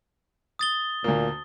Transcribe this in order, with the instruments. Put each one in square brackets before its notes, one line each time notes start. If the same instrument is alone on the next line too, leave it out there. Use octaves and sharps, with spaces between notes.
[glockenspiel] D#6 A6 G7
[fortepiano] D2 A#3 [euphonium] A#2